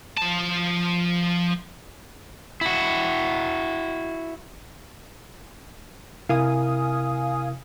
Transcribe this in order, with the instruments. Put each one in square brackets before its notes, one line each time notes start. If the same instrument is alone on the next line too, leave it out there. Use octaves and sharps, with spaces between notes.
[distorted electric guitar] F3 A5
[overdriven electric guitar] E4 F#4
[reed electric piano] C3 E4 A#4 [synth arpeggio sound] F5 G#5 D#6